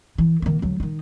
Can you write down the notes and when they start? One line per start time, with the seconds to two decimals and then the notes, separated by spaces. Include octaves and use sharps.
0.18 E3
0.42 D#3 A#3
0.62 D2 F#3
0.80 D#3 D#4